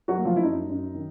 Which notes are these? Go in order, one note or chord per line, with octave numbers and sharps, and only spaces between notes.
F#3 F#4
A#3
F3 F4
E4
F#2 D#4
F#2
D#3